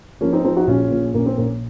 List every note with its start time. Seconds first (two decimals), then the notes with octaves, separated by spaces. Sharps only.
0.21 F3 A#3 C#4
0.33 C4 D#4
0.44 F3 C4 D#4
0.56 D#4 F#4
0.67 A#1 C#4 F4
0.91 A#2
1.14 A#1 A#3 C#4
1.26 C4
1.37 A#1 A#3 C#4